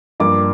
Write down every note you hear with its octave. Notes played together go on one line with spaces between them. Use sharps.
G2 F3 A#3 D6